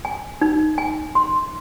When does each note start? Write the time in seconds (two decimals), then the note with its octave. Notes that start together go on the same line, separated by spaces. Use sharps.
0.05 G#5
0.41 D#4
0.78 G#5
1.15 C6